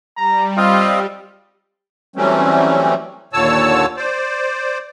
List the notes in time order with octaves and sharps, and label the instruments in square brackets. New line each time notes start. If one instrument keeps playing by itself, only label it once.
[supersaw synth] G3 [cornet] A#5
[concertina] C4 D#5 F5 [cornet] F4
[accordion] E3 F#3 G3 A3 C4 C#4
D#2 A#2 D3 C#5 A5 E6
C5 D5